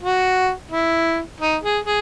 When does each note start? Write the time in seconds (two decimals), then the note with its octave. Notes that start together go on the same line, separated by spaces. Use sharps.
0.03 F#4
0.71 E4
1.40 D#4
1.63 G#4
1.85 G#4